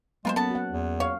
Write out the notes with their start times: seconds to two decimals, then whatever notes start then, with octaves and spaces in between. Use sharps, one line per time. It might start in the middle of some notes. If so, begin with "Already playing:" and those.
0.25 F#3 G#3 A#3 B3 F4 A#4 C5
0.36 B3 C#4 A4 A5
0.51 F#4 F#5
0.71 E2
1.00 C#5 F5